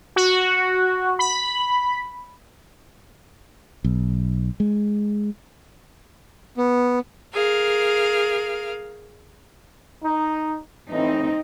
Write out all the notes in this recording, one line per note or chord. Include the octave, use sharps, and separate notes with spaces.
F#4
B5
B1
G#3
B3
G#4 A#4 F5
D#4
A2 E3 C4 D#4